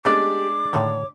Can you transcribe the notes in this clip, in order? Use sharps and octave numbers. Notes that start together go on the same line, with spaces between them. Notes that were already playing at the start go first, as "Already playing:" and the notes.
G#3 A3 B3 C#4 D4 G4 D5 D6
A2 D3 D#3 C#5